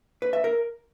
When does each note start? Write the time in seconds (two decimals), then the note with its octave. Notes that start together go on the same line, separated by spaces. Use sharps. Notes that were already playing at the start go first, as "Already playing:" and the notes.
0.22 B4
0.33 E5
0.44 A#4